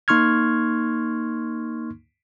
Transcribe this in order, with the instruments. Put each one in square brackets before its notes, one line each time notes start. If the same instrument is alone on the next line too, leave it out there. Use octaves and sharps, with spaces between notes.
[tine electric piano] A#3 D#4 C6 C#6 F6 G#6